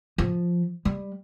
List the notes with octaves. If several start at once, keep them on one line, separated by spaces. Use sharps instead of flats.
F3
G3